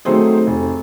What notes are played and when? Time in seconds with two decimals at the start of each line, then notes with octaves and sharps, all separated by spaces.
0.05 D#3 F#3 A3 C4 G#4
0.47 F1